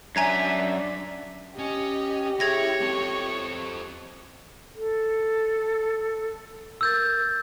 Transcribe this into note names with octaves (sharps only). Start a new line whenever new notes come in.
F#2 D4 E5 G#5 A#5 G#6
C#4 G4 D#5
E4 G#4 C#5 G#6 A#6
C4 A4
A4
A#4 E6 G6 A6